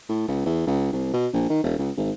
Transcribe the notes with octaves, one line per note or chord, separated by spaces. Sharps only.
A2
C#2
E2
C#2
C2
B2
A#1
D#3
E1
C#2
G#1